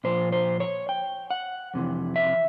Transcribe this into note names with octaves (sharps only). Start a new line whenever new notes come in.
A#2 F3 C5
C5
C#5
G5
F#5
F2 C3 E3
E5